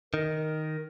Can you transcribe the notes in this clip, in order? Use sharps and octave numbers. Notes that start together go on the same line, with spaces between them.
D#3 A#4